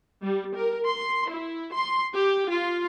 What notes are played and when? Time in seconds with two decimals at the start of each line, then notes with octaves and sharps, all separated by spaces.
0.21 G3
0.55 A#4
0.87 C6
1.30 E4
1.73 C6
2.13 G4
2.49 F4